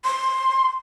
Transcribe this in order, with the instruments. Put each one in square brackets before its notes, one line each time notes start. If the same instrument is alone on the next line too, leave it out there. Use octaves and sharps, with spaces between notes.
[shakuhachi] C6